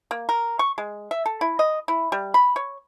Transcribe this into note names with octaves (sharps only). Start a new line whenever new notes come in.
A#3
A#4
C#6
G#3
E5
A4
E4
D#5
E4
G3
B5
C#5